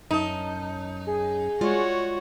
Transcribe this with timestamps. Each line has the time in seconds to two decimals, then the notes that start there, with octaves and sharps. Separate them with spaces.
0.11 F#2 C#4 D#4 A5
1.07 G#4
1.61 G#3 F4 F#4 C#5 D5